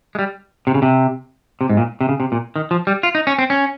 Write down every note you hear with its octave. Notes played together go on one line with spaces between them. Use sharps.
G#3
G3
C3
C#3
C3
C3
G#2
A#2
C3
C#3
C3
A#2
D#3
F3
G3
F4
D#4
C#4
C4
C#4